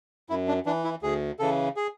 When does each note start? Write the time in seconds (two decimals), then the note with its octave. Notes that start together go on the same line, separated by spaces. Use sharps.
0.29 F#2 E4
0.48 D4
0.66 E3 D4
0.84 E4
1.02 D2 G#4
1.39 C#3 E3 A4
1.76 G#4